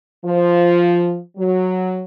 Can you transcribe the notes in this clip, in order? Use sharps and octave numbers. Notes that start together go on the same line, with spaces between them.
F3
F#3